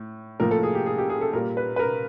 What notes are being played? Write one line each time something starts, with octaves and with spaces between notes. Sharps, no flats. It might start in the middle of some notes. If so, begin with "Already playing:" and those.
Already playing: A2
A2 F3 A#3 A#4
A4
G#4
G4
G#4
G4
G#4
A4
A#2 G3 A#3 A#4
B4
B4
A#4